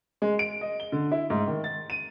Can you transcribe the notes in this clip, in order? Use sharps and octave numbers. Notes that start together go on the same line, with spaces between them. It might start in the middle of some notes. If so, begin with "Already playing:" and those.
G#3
D7
D#5
G7
D3
E4
G#2
D#3
A6
D#7